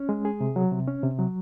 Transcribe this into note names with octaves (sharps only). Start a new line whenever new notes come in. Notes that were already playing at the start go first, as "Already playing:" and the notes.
Already playing: C#4
G#3
G#4
C3
F#3
C3
C#4
C3
F#3